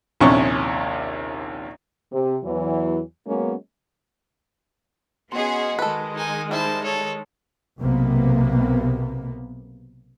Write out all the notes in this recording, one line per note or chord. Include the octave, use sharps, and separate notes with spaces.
A#1 D#2 C3 C#4 E4 C#6
C3
E2 E3 F#3
F#3 G#3 A#3 B3 C#4
B3 C#4 F#4 G#4 D#5 C6
D#3 G#3 A4 B4
D#4 G#5
G3 E4 C5 A5
A4 C#5
B1 C3 A#3 B3